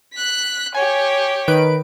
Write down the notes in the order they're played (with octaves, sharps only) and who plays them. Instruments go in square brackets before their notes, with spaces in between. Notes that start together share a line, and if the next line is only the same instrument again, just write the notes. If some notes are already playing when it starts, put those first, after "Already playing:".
[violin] F#6 B6
[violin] G4 C#5 [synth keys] G#5
[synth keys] D#3 B4 D7